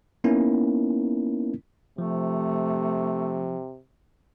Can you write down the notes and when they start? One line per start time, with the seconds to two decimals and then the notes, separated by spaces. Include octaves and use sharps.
0.24 A#3 B3 C#4 D#4 E4 A#4
1.98 C3 F3 A3